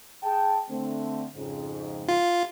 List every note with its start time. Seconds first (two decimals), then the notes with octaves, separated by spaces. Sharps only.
0.22 G#4 G5 A5
0.70 D3 A3 C4
1.35 F2 G#2 C#3
2.08 F4